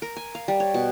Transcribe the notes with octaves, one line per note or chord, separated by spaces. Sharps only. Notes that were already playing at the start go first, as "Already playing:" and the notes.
A#4
G#5
F5
G3
C#5
B2